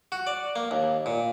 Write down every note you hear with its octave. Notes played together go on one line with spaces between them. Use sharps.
F#4
D5
A#3
D#2
A#2